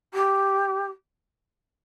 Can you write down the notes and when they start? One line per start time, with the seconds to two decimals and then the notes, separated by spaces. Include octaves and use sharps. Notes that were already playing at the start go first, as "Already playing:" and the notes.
0.13 G4